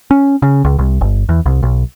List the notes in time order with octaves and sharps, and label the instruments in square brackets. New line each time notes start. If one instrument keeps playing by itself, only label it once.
[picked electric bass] C#4
C#3
C#2
C2
G1
E2
C2
B1